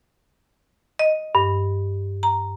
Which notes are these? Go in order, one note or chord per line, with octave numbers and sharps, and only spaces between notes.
D#5
G2
A#5